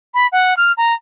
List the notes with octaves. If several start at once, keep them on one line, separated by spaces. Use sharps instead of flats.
B5
F#5
F6
A#5